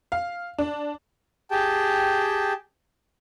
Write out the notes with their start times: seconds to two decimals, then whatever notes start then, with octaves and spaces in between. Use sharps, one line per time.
0.12 F5
0.58 D4
1.50 G4 G#4 G5 A5